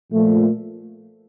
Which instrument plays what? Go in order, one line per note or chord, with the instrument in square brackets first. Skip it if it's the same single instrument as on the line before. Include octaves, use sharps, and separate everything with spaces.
[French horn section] A#2 F3 A3